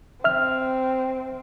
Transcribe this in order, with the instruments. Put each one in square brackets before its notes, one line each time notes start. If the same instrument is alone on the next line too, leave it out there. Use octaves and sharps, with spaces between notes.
[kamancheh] C4 [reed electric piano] E5 F6